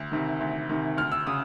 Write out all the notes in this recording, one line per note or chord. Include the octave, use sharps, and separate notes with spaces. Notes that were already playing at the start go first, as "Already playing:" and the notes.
Already playing: D2
C3 D#3
D2
C3 D#3
D2 F6
E6
C#3 D#6